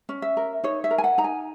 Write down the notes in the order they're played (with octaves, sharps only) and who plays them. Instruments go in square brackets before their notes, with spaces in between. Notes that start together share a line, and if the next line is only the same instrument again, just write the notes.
[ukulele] C#4
E5
A#4
D#4 C#5
E5
A#4
G#5
F#5
D#4 A#5
G#5